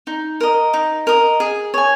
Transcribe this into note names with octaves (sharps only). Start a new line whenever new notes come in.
D#4
A#4 D#5
D#4
A#4 D#5
G#4
C#5 G#5